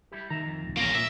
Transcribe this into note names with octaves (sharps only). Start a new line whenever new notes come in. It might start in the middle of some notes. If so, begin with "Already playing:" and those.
G3 E4 G4
D#2 D#3 E5 A#5
F2
D1 C2
A1 A#3 C#4 F5 A#5
A#2 E5